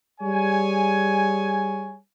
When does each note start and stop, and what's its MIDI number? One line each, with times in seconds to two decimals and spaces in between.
0.21 1.96 55
0.21 1.96 68
0.21 1.96 73
0.21 1.96 80